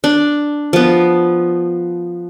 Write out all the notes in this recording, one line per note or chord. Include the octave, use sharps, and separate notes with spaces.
D4
F3 B3